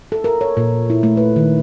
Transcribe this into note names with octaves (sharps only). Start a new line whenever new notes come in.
A4
A#4
C#5
A#2
E4
A3
B4
D#3